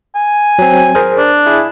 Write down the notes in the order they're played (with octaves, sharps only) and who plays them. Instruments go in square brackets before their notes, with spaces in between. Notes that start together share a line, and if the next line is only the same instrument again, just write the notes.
[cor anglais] G#5
[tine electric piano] F#3 C4
G#4 A#4 C5
[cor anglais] D4
[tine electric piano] E4 G#4